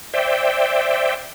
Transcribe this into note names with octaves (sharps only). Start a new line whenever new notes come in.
C5 D5 E5 G5